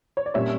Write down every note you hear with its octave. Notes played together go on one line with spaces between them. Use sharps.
C#5
D5
A#2 G3 C#4 C#5 E5